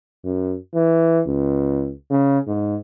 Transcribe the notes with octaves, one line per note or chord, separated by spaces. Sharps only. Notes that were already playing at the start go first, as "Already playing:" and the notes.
F#2
E3
C#2
C#3
G#2